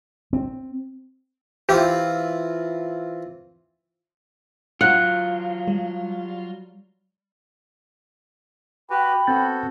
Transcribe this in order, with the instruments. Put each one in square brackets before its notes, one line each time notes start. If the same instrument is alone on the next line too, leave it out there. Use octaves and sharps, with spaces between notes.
[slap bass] C4
[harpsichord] E3 C4 F4 [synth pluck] G4
[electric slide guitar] F#3 F4 [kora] F#5
[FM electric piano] G3
[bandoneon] F#4 G4 B4 [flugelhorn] G5 [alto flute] B5
[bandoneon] B3 F#4 A4 [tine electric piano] C4 G6 A6